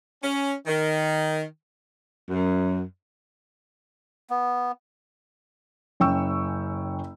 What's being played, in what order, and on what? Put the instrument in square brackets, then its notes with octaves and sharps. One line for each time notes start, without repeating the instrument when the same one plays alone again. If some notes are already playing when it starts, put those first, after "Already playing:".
[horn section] C#4
D#3
[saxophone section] F#2
[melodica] B3
[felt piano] F#1 C#4 G5 C#6 E6